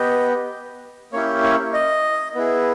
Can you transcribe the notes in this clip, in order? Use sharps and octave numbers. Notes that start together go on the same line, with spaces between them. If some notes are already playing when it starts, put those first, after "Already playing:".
Already playing: B3 G4 D#5
A#3 C#4 E4 G4 C#5
C#5
D#5
B3 E4 G#4